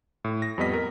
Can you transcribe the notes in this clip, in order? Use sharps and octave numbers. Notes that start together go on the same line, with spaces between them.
A2
A#6
F2 G3 B3 D#5 B6
A#4